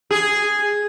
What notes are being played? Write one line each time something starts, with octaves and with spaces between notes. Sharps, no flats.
G#4